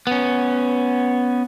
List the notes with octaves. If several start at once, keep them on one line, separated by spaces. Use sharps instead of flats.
B3 C#4